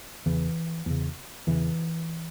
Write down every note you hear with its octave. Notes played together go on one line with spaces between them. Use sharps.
E2 C#3 E3
E2 C#3
E2 C#3 E3